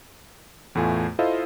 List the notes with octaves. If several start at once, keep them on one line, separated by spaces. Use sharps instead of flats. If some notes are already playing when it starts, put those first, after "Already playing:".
E2 A2 A3 F4 G#5
E4 F4 A4 C5 D#5 F5